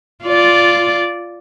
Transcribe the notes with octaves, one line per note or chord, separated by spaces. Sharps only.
F4 D5